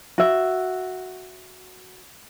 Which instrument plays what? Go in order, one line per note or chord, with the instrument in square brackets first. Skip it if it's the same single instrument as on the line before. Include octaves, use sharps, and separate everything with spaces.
[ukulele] F#4 E5